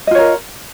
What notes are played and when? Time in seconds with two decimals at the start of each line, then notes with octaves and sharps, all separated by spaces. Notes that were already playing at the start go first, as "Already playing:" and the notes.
0.07 D#5
0.11 F4
0.15 C#5
0.18 A#4